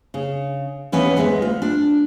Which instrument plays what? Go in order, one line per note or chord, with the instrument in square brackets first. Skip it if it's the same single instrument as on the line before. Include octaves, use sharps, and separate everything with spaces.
[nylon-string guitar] C#3
D#2 E3 B3 C#4 B4 E5
D2 G#3 B3 E5
F4
D4